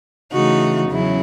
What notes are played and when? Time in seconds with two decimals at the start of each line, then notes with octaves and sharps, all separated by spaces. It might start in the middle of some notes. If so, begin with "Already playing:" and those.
0.33 C#3 E3 A3 D#4 F#4
0.90 E2 C#3 F#3 C#4 E4